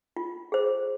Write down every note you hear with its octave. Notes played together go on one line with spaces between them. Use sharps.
F4
G#4 C5